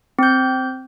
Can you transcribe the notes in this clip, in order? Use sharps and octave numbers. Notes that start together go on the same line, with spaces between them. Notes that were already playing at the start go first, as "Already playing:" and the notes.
C4 G6